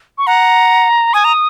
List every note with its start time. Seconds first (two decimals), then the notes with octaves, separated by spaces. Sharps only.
0.18 C#6
0.27 F#5 A#5
1.14 G#5 D#6
1.24 A#5